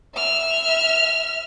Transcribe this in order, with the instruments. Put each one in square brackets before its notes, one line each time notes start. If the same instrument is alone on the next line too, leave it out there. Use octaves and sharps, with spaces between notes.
[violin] E5 F6